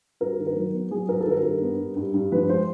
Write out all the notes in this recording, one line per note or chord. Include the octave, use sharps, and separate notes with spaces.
G2 A#4
D#3
A#4
F#3
B3
F#3 G#4
G2 A#4
A4
D#3
A#4
G2
B3
G2
G2
G2
F3 B4
G#3 C5